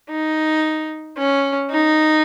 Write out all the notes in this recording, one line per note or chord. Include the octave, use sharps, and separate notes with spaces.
D#4
C#4
D#4